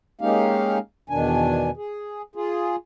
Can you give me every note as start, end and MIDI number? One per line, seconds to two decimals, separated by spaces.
0.21 0.78 56
0.21 0.78 58
0.21 0.78 61
0.21 0.78 63
0.21 0.78 67
0.21 0.78 77
1.10 1.70 40
1.10 1.70 47
1.10 1.70 51
1.10 1.70 62
1.10 1.70 80
1.77 2.22 68
2.35 2.76 65
2.35 2.76 68